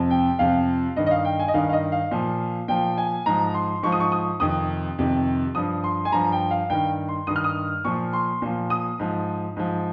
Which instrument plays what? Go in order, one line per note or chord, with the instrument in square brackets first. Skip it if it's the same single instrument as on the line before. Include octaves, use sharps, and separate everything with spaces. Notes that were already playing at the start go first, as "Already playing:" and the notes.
Already playing: [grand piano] F2 C3 F3
G5
F2 C3 F3 F5
G2 D#3 D#5
D#5
F5
G5
G#5
D#5
G2 D#3 F5
F5
D#5
F5
A#2 F3
A#2 F3 G5
G#5
G#2 F3 A#5
C6
G#2 F3 C#6
D#6
C#6
D#6
F2 C3 D#3 D#6
F2 C3 D#3
G2 F3 D#6
C6
G#5
G2 F3 A#5
G5
F5
G2 D#3 G5
C6
G2 D#3 D#6
F6
D#6
A#2 F3 C#6
C6
A#2 F3
D#6
G#2 F3
G#2 F3